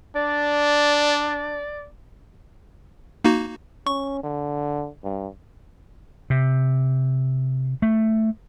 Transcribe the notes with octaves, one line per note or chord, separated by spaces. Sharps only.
D4 D5
A#3 D#4 F#4
C#4 C#6
D3
G2
C3
A3